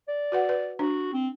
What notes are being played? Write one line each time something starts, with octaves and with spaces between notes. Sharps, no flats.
D5
F#4 B4 F#5
B4
D4 F#4
C4